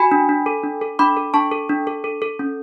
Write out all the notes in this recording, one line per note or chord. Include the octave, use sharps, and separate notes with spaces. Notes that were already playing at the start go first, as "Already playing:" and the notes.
Already playing: F#4 G#5 B5
D4
D4
A4
D4
A4
D4 B5 D6
A4
D4 A5 C#6
A4
D4
A4
A4
A4
C#4